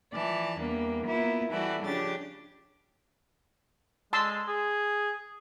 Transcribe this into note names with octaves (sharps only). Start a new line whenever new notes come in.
E3 F3 D5 A5
E2 G3 A#3 D4
A#3 B3 E4 F4
E3 G3 E4 F#4 A4 D5
C#3 F3 D4 G4 A6
G#3 A5 C6 E6
G#4